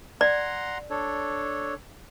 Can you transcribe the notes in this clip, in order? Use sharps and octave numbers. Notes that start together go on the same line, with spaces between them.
D5 F#5 A#5 C6
D4 A4 C#5